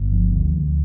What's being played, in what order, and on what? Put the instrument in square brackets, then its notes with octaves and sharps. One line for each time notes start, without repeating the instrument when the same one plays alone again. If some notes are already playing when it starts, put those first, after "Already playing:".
Already playing: [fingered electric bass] G1
F3
D2
D2